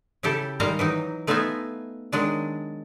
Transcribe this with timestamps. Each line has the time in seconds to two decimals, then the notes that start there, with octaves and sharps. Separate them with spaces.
0.23 C#3 E4 G4 A4
0.60 D#3 G3 G#3 F5 A#5
0.79 E3 F#3 D#4
1.27 A3 B3 D#4 F4 E5 G#5
2.12 D#3 F#3 G#3 D4